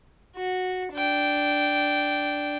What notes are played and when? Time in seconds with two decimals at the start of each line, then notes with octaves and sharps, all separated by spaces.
0.36 F#4
0.94 D4 G5